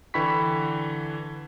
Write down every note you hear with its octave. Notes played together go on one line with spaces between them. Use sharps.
D3 E3 G5 B5 C#6 B6